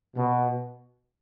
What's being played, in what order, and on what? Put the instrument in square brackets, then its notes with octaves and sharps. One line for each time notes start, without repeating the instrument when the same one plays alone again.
[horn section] B2